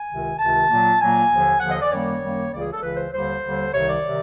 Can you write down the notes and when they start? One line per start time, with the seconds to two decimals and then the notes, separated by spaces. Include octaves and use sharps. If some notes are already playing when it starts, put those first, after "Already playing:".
Already playing: G#5
0.09 C#2 C3 D#3
0.39 C#2 C3 D#3 A5
0.69 A#2 F#3 A#3
1.00 A#2 F#3 A#3 G#5
1.30 D#2 D3 F3
1.60 D#2 D3 F3 F#5
1.71 D#5
1.81 D5
1.91 F#2 D#3 G3 A#3 C#5
2.22 F#2 D#3 G3 A#3
2.52 C#2 C#3 E3 D5
2.61 G#4
2.72 A4
2.82 C#2 C#3 E3 B4
2.96 C5
3.12 D#2 D3 G3 C5
3.42 D#2 D3 G3
3.73 C2 C3 D#3 C#5
3.88 D5
4.06 C3 D#3